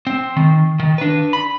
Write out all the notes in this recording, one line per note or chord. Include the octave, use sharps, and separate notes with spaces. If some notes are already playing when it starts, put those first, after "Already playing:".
C4
D#3
D#3
D4 B4
B5